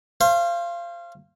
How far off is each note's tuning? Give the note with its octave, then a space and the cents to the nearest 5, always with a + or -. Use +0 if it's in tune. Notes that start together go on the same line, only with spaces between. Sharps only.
C5 +25 F5 -25